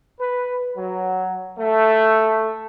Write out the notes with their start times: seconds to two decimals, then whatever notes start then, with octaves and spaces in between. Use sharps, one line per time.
0.19 B4
0.78 F#3
1.58 A3